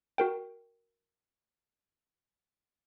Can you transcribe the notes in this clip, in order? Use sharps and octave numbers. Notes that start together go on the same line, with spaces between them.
F#4 A#4 G5